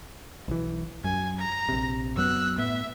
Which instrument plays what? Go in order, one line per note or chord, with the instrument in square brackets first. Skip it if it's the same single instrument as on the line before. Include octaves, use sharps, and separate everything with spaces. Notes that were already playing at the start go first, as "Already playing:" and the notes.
[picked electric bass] B1 E3
[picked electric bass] F#2 [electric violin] G#5
[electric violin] A#5
[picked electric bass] A#1 C3
[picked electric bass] F#2 F#3 B3 [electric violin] E6 F#6
[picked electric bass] A2 B3 [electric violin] E5